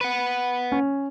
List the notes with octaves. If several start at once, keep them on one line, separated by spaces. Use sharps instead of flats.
B4 F#5
C#4